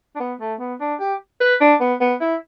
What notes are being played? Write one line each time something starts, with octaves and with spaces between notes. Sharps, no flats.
D4
B3
A3
B3
D4
G4
B4
D4
B3
B3
E4